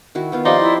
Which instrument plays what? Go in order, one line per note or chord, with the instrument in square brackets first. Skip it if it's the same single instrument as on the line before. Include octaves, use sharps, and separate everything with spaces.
[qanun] D#3 E4 F#4
D#3 B3 F4
[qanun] F3 C4 G4 [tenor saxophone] D#4 [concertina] D5 C6 [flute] F5
[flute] E4